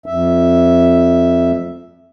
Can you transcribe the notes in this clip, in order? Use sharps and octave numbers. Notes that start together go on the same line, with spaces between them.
F2 E5